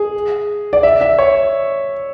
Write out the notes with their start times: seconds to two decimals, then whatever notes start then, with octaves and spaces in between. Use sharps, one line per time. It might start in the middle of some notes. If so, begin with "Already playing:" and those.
Already playing: G#4
0.73 D5
0.83 E5
1.01 E5
1.19 C#5